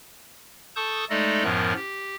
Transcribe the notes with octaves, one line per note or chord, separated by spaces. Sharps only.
A4 A5 C#6 D#6 G6
G#3 A3 D#4 A4 D5 D#5
F#2 A2 F3 B3 A#4 F#6
G4